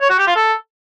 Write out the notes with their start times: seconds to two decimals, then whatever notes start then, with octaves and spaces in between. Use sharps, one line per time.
0.01 C#5
0.10 F#4
0.19 G4
0.27 F4
0.36 A4